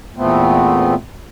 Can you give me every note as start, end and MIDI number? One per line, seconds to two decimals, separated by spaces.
0.16 0.95 40
0.16 0.95 46
0.16 0.95 57
0.16 0.95 59
0.16 0.95 60